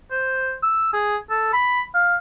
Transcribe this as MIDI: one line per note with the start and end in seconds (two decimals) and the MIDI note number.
0.11 0.54 72
0.63 0.91 88
0.94 1.16 68
1.30 1.48 69
1.53 1.83 83
1.94 2.16 77